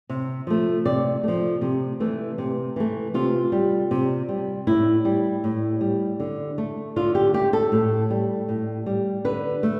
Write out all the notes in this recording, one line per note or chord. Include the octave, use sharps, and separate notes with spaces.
C3
F3 A3
C3 D5
F3 A3
C3
E3 A3
C3
E3 A3
C3 F4
G3
C3
G3
A2 E4
G3
A2
G3
D3
A3
D3 F4
G4
A3 G4
A4
A2
G3
A2
G3
D3 B4
A3